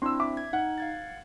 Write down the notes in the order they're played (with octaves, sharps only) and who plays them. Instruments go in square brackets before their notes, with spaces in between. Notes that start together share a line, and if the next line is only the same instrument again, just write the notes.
[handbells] C4 D4 E4 [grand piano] C6 E6
[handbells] E5 [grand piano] D6
[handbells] G#6
[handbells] D#4 [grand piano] F#5
[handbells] F5 G#6 A6